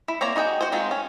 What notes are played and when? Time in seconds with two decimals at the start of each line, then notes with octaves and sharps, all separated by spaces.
0.08 E4
0.21 A#3 C4 C#5 D5 A#5
0.36 D#4 F#4 G#4 G5
0.61 F#4 C5
0.72 D#3 G#3 C4 F4
0.91 C#4